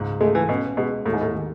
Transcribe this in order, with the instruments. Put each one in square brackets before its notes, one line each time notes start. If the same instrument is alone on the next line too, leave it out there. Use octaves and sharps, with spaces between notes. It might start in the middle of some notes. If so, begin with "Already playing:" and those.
Already playing: [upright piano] C#2 G#2
[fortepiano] G#3 [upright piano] A3
[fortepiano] E3
[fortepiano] B2 [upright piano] C#4
[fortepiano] B2 [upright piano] G#3
[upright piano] D#2 [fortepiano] A2
[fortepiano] G#2
A2
[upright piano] D#3